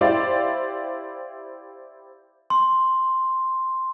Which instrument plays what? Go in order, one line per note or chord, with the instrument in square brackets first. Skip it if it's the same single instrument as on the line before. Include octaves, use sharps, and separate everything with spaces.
[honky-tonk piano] E4 G4 C5 D5 F5
[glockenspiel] C6